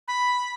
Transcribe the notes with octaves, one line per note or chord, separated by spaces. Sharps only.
B5